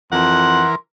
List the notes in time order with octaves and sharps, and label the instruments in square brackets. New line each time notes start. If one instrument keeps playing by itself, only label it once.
[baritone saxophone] F2 [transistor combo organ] E3 A#4 [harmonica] F#5 [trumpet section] C6